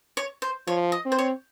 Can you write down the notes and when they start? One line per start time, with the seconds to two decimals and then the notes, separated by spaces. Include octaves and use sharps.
0.17 C#5
0.42 C5
0.67 F3 C#5
0.92 D#5
1.06 C4
1.12 C5
1.19 C#5